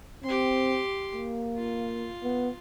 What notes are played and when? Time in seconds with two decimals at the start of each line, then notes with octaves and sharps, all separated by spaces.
0.24 C4 G4 C6
1.15 A#3
1.56 F4
2.23 B3